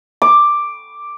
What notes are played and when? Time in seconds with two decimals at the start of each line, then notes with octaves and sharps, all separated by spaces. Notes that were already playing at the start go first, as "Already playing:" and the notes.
0.22 D6